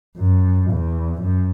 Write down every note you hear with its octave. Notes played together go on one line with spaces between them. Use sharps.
F#2
E2
F#2